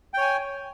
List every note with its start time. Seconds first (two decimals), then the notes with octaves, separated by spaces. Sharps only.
0.14 G5
0.18 C#5
0.21 G#5